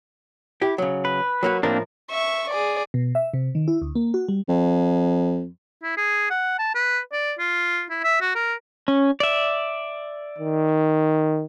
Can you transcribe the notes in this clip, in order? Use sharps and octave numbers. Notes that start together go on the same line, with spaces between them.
E4 G4
C#3 F#3
B4
F#3 A#3 F#4
A2 F3 A#3 C4 D4 A#4
E5 C#6
G#4 D5
B2
E5
C3
D#3
E4
D2
A#3
F#4
G3
F2
E4
G#4
F#5
A5
B4
D5
F4
E4
E5
F#4
A#4
C#4
D5 E5
D#3